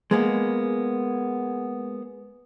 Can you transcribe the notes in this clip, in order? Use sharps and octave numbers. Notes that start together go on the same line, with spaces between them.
G#3 A#3 B3